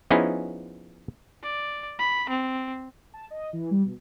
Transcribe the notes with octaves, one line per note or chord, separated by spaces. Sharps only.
F3 B3 C#4 D#4 E4 G#4
D5
B5
C4
A5
D#5
E3
G3
B2